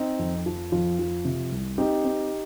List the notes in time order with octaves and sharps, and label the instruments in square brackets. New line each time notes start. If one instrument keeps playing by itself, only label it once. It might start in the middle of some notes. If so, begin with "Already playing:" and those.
Already playing: [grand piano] C4 D#4
F2
F3
F2 F4
F3
C3
C2
C4 D#4 G4
C4